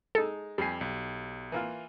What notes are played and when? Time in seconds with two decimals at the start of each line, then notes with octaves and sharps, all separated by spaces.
0.15 G#3 D#4 A4
0.58 F2 G3 G4 G#5 C7
0.81 B1
1.52 E3 A#3 F4